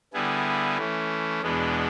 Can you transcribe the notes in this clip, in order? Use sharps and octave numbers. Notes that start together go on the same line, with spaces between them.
D3 G3 B3 E4 G#4
E3 A3 C#4
E2 B2 G#3 B3 D4